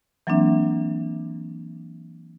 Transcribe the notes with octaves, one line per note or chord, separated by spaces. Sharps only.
E3 F#3 A#3 C4 D4 E5